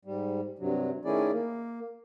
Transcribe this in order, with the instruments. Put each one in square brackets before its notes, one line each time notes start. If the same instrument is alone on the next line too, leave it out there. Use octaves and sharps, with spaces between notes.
[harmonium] G#2 G3
G2 C3 F#3
D#3 A3 C#4 E4 G#4 D5
A#3